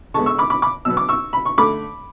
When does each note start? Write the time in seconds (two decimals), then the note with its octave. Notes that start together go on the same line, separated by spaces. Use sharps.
0.14 D3 G#3 B3 A5 C#6
0.26 C#6 E6
0.38 B5 D6
0.50 B5 D6
0.62 B5 D6
0.85 B2 F#3 B3 E6
0.97 D6
1.09 C#6 E6
1.33 B5
1.45 C#6
1.58 D3 A3 B5 D6